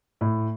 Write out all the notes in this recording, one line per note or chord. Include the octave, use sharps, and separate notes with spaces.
A2